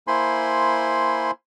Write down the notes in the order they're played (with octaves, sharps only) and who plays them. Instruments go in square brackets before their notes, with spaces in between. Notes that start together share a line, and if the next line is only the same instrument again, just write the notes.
[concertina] A#3 E4 C5 G#5 B5 C6